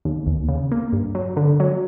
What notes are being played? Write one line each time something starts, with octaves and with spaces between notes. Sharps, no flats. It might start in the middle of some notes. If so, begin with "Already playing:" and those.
D#2
D#2
C#3
A#3
G2
F#3
D3
F#3